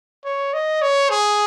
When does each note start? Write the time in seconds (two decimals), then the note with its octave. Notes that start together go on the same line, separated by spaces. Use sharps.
0.25 C#5
0.53 D#5
0.82 C#5
1.10 G#4